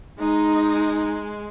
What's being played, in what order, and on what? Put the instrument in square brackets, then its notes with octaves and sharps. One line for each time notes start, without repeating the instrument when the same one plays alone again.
[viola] G#3 [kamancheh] D#4